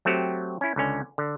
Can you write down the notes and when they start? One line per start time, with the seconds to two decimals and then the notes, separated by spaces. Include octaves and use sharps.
0.05 F#3 A3 C4 F#4 G4
0.61 C#4 E4
0.76 C#2 D3 C#4
1.18 D3